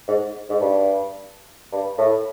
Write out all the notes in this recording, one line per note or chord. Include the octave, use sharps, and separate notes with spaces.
G#2
G#2
G2
G2
A2